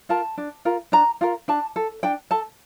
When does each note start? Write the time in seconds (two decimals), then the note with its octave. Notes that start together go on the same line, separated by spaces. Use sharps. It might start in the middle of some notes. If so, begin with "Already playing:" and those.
0.09 F4 A#4 A5
0.38 D4
0.65 F4 A#4
0.92 D4 A#5
1.21 F4 A#4
1.48 D4 A5
1.76 A4
2.03 D4 G5
2.31 A4 A5